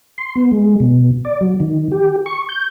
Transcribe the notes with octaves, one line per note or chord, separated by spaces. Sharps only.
C6
B3
G#3
B2
D5
F#3
D#3
G4
C#6
G6